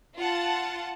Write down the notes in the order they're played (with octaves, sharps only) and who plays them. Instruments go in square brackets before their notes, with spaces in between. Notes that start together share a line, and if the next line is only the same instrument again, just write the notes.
[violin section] F4 F#5 A5